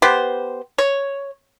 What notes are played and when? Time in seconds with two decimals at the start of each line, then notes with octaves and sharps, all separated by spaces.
0.02 B3 G4 C5
0.78 C#5